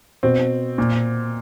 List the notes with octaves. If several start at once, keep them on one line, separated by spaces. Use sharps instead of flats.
B2 C4
A#2